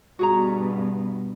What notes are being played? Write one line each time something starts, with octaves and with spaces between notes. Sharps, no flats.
G2 B2 B3 F#4 G#4 A#5